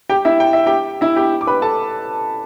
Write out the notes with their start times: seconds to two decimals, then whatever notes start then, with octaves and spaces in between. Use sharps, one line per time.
0.09 G4 G5
0.25 E4 E5
0.40 G5
0.53 E5
0.66 G4 G5
1.01 E4 E5
1.16 G4 G5
1.41 D6
1.47 B4 B5
1.62 A4 A5